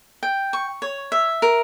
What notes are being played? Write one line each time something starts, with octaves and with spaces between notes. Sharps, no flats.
G5
C#6
C#5
E5
A#4